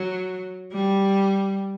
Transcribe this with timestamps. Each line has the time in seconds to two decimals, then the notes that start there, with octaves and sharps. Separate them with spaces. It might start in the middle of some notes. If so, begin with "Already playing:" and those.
Already playing: F#3
0.73 G3